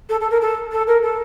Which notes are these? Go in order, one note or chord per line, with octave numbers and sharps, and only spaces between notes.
A4
A4
A#4
A4
A4
A#4
A4